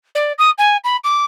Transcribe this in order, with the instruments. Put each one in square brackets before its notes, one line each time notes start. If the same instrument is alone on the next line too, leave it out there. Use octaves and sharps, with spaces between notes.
[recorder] D5
D#6
G#5
B5
D6